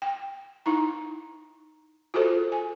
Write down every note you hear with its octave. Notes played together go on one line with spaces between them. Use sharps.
G5
D#4 E4 A#5
F4 F#4 G#4 A4 C5
G#5